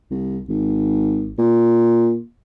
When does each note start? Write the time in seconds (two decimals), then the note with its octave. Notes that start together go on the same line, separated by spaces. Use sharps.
0.11 C2
0.49 G#1
1.38 A#2